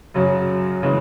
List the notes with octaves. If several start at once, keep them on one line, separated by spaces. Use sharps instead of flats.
F#2 C#3 F#3
C#3 E3 G#3